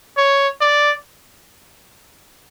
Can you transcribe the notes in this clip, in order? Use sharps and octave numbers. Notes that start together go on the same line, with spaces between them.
C#5
D5